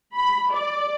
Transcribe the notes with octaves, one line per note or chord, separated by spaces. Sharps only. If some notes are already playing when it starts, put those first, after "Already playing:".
B5
D5